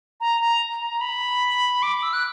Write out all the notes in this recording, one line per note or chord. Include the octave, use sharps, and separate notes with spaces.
A#5
A#5
A#5
B5
D6
E6
F#6